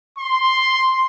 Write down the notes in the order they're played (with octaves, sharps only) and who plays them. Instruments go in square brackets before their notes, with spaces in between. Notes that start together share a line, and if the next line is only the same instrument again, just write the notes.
[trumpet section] C6